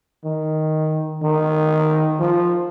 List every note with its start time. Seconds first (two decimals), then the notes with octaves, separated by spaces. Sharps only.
0.24 D#3
1.22 D#3
2.20 F3